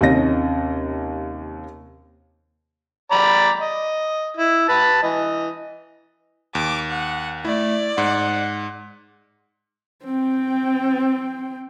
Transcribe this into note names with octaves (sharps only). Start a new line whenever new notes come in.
D#2 C3 C#4 D#5 A#6
D5 A#5 B5
D#5
E4
B4 A5 B5
E3 D#5
D#2 D6
F#5
A3 E4 D5
G#2 F#5
C4 G5